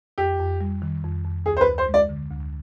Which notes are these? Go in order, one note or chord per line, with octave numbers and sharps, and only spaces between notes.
F2 G4
F2
G3
D#3
F2
F2
D2 G#4
C5
B4
D2
C5
G#3
D5
D3
D2